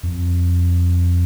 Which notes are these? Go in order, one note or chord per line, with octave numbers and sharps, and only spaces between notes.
F2